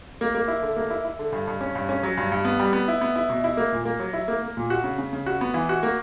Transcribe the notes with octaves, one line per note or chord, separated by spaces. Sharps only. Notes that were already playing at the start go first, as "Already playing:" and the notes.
A#3
A#3
E4
D3
A#3
E4
E4
D3
G2
G2
C#4
G2
C#4
F#3
G2
G2
B3
G3
B3
E4
B3
E4
B2
E4
A#3
A#2
A#3
F#3
E4
A#3
A#3
A#2
F#4
C#3
C#3
C#3
F#4
B3
E3
F#4
A#3